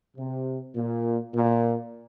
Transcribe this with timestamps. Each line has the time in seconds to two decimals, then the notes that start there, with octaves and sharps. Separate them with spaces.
0.17 C3
0.76 A#2
1.34 A#2